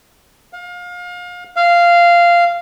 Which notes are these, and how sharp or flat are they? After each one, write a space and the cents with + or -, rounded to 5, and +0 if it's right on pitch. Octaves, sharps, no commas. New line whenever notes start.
F5 +30
F5 -10